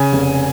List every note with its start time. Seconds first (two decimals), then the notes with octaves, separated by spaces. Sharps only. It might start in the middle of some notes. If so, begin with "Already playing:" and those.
Already playing: C#3 G#5
0.13 F1